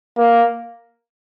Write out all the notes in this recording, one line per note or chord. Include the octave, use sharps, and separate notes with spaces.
A#3